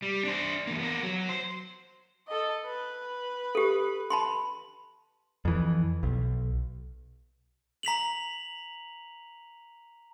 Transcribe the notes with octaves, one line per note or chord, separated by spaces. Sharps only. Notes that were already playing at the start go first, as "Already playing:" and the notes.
G3
D4 C5
E3 A#3
B3 A#4
F#3 F#4
C5
A4 D#5
B4
G4 A4
A5 B5 C6
F2 E3
B1
A#5 B6 F7 F#7